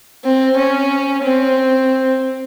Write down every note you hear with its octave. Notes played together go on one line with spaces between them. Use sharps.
C4
C#4
C4